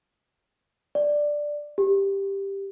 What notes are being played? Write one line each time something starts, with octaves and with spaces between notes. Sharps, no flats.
D5
G4